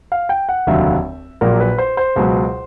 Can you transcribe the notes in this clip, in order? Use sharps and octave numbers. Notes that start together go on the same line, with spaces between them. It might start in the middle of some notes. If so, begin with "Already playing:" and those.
F5
G5
F#5
F1 D#2 D3 F#3 E5
A#1 A#2 F#3 A#4
B4
C5
C5
C#2 B2 F#3